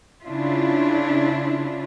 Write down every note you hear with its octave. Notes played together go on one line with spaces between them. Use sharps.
C#3 D4 E4 F4